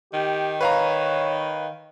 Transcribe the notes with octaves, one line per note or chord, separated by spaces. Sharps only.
D#3 G4
B4 C#5 F5 A#5